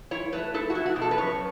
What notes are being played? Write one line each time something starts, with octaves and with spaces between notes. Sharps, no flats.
E4 C#5
A3 B4
E4 A4
F#4
E4
F#4
B2
A4
B4
F#2 C#5